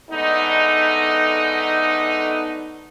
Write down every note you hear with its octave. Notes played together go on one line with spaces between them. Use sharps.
D3 G#3 A3 B3 D#4